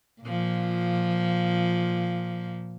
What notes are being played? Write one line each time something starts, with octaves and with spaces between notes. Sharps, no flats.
A#2 F3